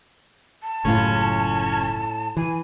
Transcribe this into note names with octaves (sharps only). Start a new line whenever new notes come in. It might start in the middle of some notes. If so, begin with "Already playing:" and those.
A5
F#1 A2 C#4 F4
E3 G#5